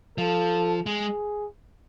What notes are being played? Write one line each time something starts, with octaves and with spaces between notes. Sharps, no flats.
F3 A4
G#3 G#4